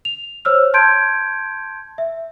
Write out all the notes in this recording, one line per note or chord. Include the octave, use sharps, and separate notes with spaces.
F7
C5 C#5 E6 F6
A5 C6 G6 G#6 D7
E5